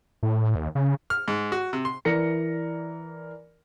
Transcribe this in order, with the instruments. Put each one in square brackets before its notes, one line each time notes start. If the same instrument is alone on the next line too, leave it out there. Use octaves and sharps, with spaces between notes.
[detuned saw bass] A2
D#2
C#3
[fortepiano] F6
G#2
F#4
C3
C6
[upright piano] E3 A#4 D5 A#6 C#7